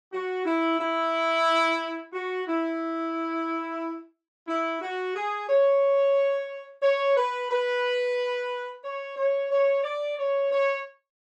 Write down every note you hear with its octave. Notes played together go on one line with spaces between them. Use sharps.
F#4
E4
E4
F#4
E4
E4
F#4
G#4
C#5
C#5
B4
B4
C#5
C#5
C#5
D5
C#5
C#5